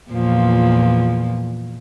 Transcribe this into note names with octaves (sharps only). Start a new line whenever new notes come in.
E2 A#2 F3